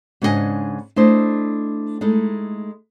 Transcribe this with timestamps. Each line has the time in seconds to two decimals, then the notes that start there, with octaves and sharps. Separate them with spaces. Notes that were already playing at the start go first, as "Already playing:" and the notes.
0.22 G#2 C#3 D4 F4 D#5 G#5
0.96 A3 D4 E4 C5 D#5
2.01 G#3 A3 D#4 E4